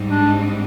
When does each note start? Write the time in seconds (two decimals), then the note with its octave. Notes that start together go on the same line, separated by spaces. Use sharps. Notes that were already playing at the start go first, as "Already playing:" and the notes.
Already playing: G#2 G3 C4 D#4
0.11 D4